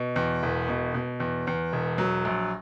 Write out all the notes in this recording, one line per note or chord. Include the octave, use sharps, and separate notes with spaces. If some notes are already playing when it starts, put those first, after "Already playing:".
Already playing: B2
E2
E1
B2
B2
E2
E2
E1
F#3
A#1